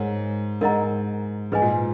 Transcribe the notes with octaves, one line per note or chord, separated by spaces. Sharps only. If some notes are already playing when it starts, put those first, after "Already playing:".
Already playing: G#2 A#4 C#5
G#2 A#4 D#5 F#5 A#5
G#2 G#4 B4 D#5 G#5
A#2